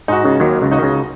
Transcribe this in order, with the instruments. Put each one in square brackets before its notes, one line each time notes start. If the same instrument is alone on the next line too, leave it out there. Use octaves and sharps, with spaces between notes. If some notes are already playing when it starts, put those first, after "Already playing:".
[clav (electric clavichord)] G#2 [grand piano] D#4 F#4
[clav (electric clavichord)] C#2 C#3
[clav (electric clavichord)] D#2 D#3 [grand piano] F#3
[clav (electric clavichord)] C#2 C#3
[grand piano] D#4 F#4 D#5
[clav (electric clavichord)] D#3
C#2 C#3